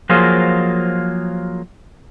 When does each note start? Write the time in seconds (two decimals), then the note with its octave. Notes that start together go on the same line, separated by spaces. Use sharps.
0.09 F3 F#3 A#3 F4 G#4 C5